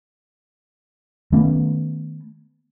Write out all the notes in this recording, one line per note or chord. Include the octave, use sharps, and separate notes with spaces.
D#3 A3 B3 C#4